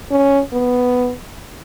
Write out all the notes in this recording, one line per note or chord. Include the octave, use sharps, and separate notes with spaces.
C#4
B3